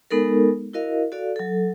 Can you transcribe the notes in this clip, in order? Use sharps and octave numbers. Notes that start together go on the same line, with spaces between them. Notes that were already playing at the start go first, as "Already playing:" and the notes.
G#3 B3 D#4 A4 A#4
E4 F#4 A#4 D#5 F5
F#4 A4 D5 F5
F#3 A4